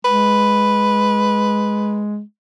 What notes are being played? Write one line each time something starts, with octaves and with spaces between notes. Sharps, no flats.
G#3 B4